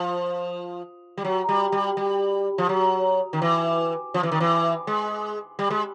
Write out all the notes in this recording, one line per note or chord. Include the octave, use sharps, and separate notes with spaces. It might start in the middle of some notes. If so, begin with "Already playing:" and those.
Already playing: F3
G3
F#3
G3
G3
G3
F3
F#3
D#3
E3
F3
E3
D#3
E3
G#3
G3
G#3